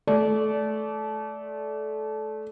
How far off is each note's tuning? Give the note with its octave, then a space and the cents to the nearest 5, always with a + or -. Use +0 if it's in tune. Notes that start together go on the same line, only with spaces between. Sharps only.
A3 -20 D5 -20